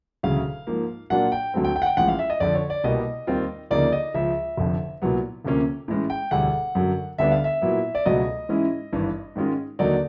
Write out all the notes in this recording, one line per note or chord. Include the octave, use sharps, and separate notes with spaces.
E1 D2 C#3 F#3 F5
G#2 F3 A#3
A#2 F#3 A#3 D4 F4 F#5
G5
D2 D3 F#3 A3 C4
G5
G5
F#5
G5
A1 A2 F3 G#3 F#5
F5
E5
D#5
F2 D3 F3 D5
C#5
D5
C2 B2 G3 A#3 D#5
D#2 D#3 G3 C4 F4
D2 C#3 F3 A#3 D#4 D5
D#5
C#2 C#3 F3 E5
F1 F2 D3
C2 A#2 F#3 B3
D2 C3 F3 A#3 C#4
A2 E3 G#3 C#4
G5
E1 D2 D3 G3 F#5
F#2 D3 F#3
D2 D3 G3 B3 D4 E5
F5
E5
A#2 F#3 B3 E4
D5
C#2 B2 F#3 A3 D#5
G#2 E3 G#3 C#4 E4
G#1 G2 E3
G#2 D#3 G#3 C#4 F4
D#2 D3 F#3 A#3 D#4 D5